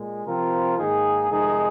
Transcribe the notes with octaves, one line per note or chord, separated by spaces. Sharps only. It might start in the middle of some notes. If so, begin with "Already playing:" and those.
Already playing: A#2 G#3
C3 F3 C4 F4 A#4
G#2 D#3 A#3 D#4 G#4
F2 C3 D#3 G#3 D#4 G#4